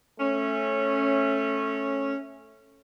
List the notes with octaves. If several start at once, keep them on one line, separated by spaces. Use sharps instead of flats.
A3 C#4